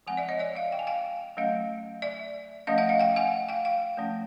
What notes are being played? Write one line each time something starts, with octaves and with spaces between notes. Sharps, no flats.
F3 G#3 C4 F#5 G#5
D5 E5
C#5 D#5
D5 E5
D#5 F5
G5
G#5
F5 G5
F#3 A3 C#4 D#5 F5
D5 E5
F3 A3 C#4 D#5 F5
E5 F#5
D#5 F5
F5 G5
F#5 G#5
F5 G5
F5 G5
F3 A3 C#4